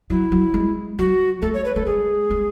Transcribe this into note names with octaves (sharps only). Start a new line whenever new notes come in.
F#3 E4
F#3
G#3
F#3 F#4
A3 A4
C#5
B4
A3 A4
G#3 G#4
G#3